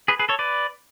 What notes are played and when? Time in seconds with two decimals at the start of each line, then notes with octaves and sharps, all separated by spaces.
0.08 G#4 B4
0.19 G#4 B4
0.29 A4 C#5
0.39 B4 D5